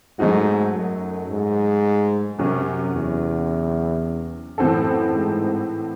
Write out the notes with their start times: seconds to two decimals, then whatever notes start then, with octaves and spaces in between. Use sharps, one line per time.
0.19 G#2 F#3 A3 D#4 F#4
0.74 F#2
1.29 G#2
2.39 F#2 C3 F#3 C#4
2.93 E2
4.58 F#2 A2 E3 C4 F#4 A4
5.13 G#2